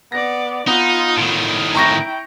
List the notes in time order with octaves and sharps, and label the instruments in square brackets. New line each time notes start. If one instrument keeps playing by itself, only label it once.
[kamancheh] B3 D5 [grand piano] A#6
[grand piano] B3 [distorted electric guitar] D#4 [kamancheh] F4
[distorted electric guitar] A2 D#3
[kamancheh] E4 G5 [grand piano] A#5 C#6 A#6